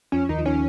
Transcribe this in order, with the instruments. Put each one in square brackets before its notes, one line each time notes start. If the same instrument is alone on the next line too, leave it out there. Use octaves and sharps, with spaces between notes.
[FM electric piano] F2 F3 [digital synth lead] C#4
[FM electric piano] D#2 D#3 [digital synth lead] D#4
[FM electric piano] F3
[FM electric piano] D#3 [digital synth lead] C#4